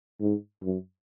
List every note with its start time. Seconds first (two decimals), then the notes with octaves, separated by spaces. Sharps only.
0.21 G#2
0.63 F#2